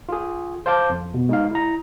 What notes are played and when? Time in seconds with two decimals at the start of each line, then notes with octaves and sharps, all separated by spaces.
0.09 F4 G#4
0.66 C5 F5 A5 D6 G6
0.89 F2
1.14 B2
1.29 G#3 D#4 F5
1.51 E4 A#5